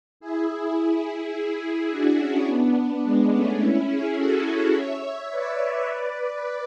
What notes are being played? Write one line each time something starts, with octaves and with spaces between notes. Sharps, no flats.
E4 G#4
E4 G#4
D4 F#4
C#4 E4
B3 D4
G#3 B3
A3 C#4
C#4 E4
E4 G#4
F#4 A4
C#5 E5
B4 D5
C#5 E5
B4 D5